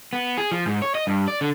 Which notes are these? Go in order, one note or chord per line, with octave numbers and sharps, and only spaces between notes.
B3
G#4
F3
G#2
C#5
D#5
G2
D5
D3